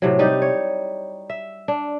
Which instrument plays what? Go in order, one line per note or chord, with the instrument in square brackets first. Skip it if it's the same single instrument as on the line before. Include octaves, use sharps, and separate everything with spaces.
[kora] A2 C3 F#3
G3 D#4 G4
C#5
E5
D4